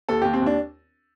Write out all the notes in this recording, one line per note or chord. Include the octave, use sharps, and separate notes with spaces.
D#2 A4
D#2 G4
C4
D#2 D4